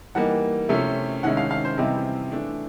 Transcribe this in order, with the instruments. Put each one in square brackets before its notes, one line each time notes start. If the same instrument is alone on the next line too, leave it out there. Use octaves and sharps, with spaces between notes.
[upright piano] E3 G3 A#3 D#4 F#5
C3 F3 A3 C#4 E4
C3 D#3 G#3 C#4 E4 F#5
F5
F5
C5
C3 E3 G3 C4 E4 D#5
E3 A3 D4